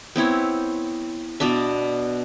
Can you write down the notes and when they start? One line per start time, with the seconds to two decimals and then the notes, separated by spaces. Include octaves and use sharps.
0.16 B3 C4 E4 C#5
1.40 B2 B3 D4 E5